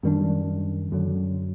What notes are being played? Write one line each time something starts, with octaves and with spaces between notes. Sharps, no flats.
F#2 D#3 G3 D4
F#2 D3 F#3